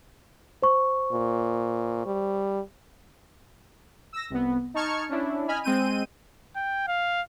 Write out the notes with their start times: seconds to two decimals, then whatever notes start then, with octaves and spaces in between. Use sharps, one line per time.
0.62 C5 C#6
1.13 A#2
2.06 G3
4.13 E6 A#6
4.30 C2 B3
4.74 D#4 A5 C#6 F6 G#6 C#7
5.09 C#4 D4 E4
5.48 D#5 G#5 B5 F6
5.64 G#3 C4 G6 D#7
6.56 G5
6.88 F5